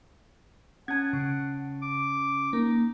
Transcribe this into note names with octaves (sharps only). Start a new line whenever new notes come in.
C#4 F#5 A5 G#6
C#3
D6
A#3 D#4